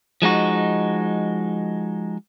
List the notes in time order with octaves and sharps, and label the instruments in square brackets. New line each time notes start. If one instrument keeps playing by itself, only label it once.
[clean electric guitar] F3 G#3 D#4 F#4